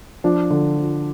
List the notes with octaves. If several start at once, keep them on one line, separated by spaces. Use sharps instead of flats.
F3 D4
D3
F3